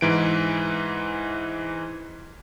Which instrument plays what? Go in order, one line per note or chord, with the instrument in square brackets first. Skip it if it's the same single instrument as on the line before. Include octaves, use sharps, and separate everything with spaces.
[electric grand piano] G#2 E3 D7